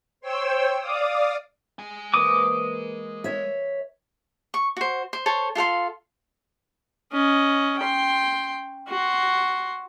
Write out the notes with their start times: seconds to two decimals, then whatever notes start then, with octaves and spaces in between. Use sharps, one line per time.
0.21 C5 C#5 G5 E6
0.79 D5 F5 D6 D#6
1.79 G#3 G#5
2.14 E3 A#3 C5 D6 D#6
3.24 C#5 E5
4.54 C#6
4.77 F#4 C5
5.13 C5
5.26 A4 C5 C#5
5.55 F4 A4 F5 C6
7.12 C#4 D#5
7.79 G5 C6
8.88 F#4 C6